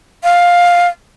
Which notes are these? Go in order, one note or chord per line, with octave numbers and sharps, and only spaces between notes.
F5